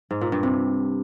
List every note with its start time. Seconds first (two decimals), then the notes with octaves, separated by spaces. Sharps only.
0.11 G#2
0.21 A#2
0.32 G2
0.43 C3